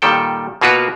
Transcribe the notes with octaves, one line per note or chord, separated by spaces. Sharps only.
A#2 D#3 G3 A4 G5
B2 A#3 F4 F#4 A#4 B4